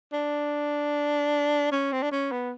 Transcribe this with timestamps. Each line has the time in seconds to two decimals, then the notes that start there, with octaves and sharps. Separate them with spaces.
0.13 D4
1.72 C#4
1.92 C4
2.02 D4
2.12 C#4
2.32 B3